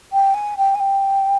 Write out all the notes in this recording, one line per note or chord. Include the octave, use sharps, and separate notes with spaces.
G5
G#5
G5
G#5
G5